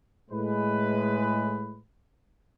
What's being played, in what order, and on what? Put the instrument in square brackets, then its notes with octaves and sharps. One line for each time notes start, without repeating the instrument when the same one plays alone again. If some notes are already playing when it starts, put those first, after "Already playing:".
[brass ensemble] A2 G#3 B4